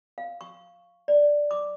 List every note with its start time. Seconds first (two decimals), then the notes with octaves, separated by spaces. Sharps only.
0.18 F5
0.41 C#6
1.08 D5
1.51 D6